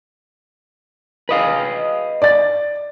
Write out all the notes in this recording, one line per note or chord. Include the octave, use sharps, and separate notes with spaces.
B4 D#5 F5
D5 A6